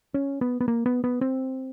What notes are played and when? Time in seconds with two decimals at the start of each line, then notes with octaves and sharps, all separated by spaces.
0.14 C#4
0.41 B3
0.61 B3
0.68 A#3
0.86 B3
1.04 B3
1.21 C4